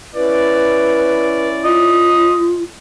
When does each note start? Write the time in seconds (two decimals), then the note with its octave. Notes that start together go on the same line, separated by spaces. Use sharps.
0.15 C#4 E4 B4 D5
1.64 F4 D#5